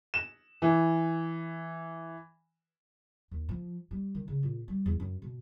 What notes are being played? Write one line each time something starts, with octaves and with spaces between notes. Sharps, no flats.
E7
E3
D#2
F3
G3
D#3
C#3
A#2
G3
E2
F#2
B2